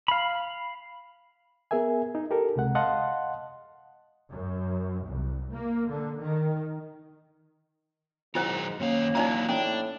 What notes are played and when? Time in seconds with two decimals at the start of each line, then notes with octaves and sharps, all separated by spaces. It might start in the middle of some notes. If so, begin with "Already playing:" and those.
0.08 F5 B5
1.71 B3 G#4 A#4 E5 G#5
2.15 D#4
2.31 G4 A4 A#4
2.56 C#2 C3 G#3 F#5
2.75 D#5 F5 F#5 A5 C6
4.30 F#2
5.07 C2
5.52 A#3
5.90 D3
6.21 D#3
8.35 G#2 D#3 F#3 D#4 E4 C5 F#5
8.80 F#2 D#3 A#3 C#4 F5
9.15 E3 F#3 D4 D#4 D5 A#5
9.49 A2 C#4 D4